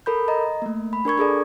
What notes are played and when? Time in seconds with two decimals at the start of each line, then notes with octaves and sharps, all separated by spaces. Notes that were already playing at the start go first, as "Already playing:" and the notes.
0.06 A4 A#4 B5 G6
0.28 D#5 A#5
0.62 A3 A#3
0.93 B5
1.05 D4 A#4 C#6 G#6
1.18 D4 G#4 A4 D5